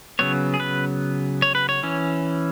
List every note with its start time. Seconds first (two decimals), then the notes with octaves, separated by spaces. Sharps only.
0.19 C#3 F#3 B3 C#5
0.54 G#4
0.60 B4
1.42 C#5
1.55 B4
1.69 C#5
1.83 E3 C#4